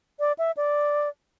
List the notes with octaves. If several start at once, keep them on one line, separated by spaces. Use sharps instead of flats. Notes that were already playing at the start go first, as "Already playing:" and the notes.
D5
E5
D5